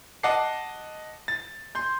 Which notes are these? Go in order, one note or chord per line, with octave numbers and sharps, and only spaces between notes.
D#5 F#5 A5 D6 C7
A6
C6 G6